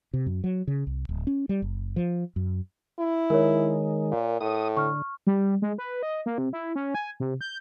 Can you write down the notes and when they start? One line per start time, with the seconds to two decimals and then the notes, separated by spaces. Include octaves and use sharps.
0.13 C3
0.26 F#2
0.44 F#3
0.67 C#3
0.87 C2
1.09 D1
1.27 C#4
1.49 G3
1.62 F#1
1.96 F3
2.36 F#2
2.99 E4
3.30 D#3 G#3 A#4 C#5
4.11 A#2
4.41 A2 D#6
4.77 D3 C#6 F6
5.27 G3
5.62 G#3
5.78 B4
6.03 D#5
6.26 A#3
6.38 C3
6.53 E4
6.76 C#4
6.95 G#5
7.20 C3
7.41 G6